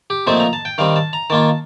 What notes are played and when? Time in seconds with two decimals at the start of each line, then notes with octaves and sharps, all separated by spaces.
0.10 G4
0.27 A#2 F3 A3 C4 D#4 C5
0.40 A#5
0.53 A5
0.65 G5
0.78 D#3 G3 C4 F5
0.96 A5
1.13 A#5
1.30 D#3 A#3 F4 A5